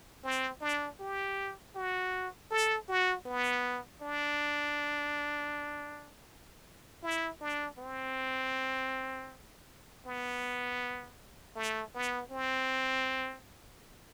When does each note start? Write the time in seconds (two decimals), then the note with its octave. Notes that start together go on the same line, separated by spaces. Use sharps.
0.24 C4
0.61 D4
1.00 G4
1.75 F#4
2.51 A4
2.88 F#4
3.26 B3
4.02 D4
7.03 E4
7.41 D4
7.78 C4
10.06 B3
11.56 A3
11.95 B3
12.31 C4